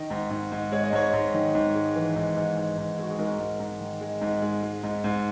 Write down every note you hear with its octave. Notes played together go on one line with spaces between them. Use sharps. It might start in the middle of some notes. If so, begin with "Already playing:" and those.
Already playing: D#3 D#5
G#2
G#2
G#2
G#3 C#5
D#5
G#2 C#5
G#2
D#3
G#2
G#3
E3
G#2
G#2
G#2
G#2
G#3 F#4
G#4
G#2 A#4
G#2
G#2
D#3
G#3
G#2
G#3
G#3
G#2
G#2